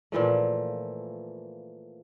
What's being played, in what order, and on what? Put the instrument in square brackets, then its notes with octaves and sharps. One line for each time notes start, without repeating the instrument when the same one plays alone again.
[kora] A#2 E3 F3 A3